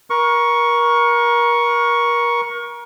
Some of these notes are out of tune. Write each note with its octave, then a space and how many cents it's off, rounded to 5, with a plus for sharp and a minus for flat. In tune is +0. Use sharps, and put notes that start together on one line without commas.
A#4 +30 C#6 +0